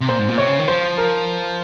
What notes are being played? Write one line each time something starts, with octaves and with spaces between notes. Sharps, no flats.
C3
A#2 C5
G#2
A#2
C3 C#5
C#3
D#3
F3 C5
A#4